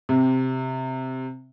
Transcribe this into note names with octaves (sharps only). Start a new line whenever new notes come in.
C3